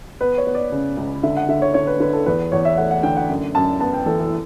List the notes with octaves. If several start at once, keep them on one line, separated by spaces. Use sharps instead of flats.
B3 B4
C#5
B3
D5
C#3
C#2
D3 E5
F#5
D3 E5
C#5
D3 C#5
B4
D3 B4
A4
E2 B4
E2 C#5
E5
A3 F#5
F#5
D3 G5
F#5
F#2
F#2 A5
B3 A5
G5
E3 A4
A4